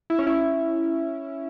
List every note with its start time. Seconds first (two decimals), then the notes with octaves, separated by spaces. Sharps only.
0.10 E4
0.19 C#4
0.27 E4